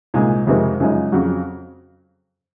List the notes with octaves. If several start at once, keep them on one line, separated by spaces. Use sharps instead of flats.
C2 A#2 G#3 D#4
F2 C3 D#3 G#3 C4
F#2 C#3 F3 G#3 D#4
F2 C#3 F#3